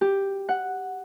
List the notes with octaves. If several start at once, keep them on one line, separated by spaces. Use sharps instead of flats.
G4
F#5